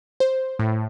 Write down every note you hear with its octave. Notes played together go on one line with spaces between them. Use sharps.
C5
A2